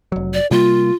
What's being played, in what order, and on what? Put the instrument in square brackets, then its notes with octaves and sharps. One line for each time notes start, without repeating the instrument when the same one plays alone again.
[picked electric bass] F1 F#3
[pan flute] D5
[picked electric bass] C3 G3 A#3 [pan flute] F4